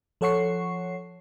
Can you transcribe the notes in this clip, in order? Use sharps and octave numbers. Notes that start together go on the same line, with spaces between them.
F3 A4 C#5 F#5 C#6 C7